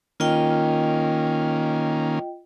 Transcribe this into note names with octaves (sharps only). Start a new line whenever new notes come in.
D#3 A#3 C#4 F4 D#5 G5